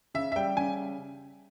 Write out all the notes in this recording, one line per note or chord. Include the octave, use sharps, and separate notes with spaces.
C#3 E5
E5
G3 G5
C#3 G#5